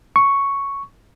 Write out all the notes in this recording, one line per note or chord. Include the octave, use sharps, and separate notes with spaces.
C#6